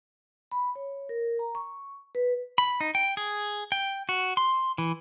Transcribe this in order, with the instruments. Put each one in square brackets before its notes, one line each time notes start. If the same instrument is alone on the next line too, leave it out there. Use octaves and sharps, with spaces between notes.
[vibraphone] B5
C#5
A#4
A#5
C#6
B4
[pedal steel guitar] B5
D#4
G5
G#4
G5
F#4
C6
E3